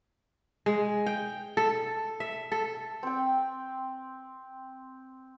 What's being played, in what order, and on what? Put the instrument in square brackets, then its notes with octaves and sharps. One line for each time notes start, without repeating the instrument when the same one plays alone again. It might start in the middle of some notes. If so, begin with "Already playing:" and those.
[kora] G#3
G5
A4
E5
A4
[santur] C4 G5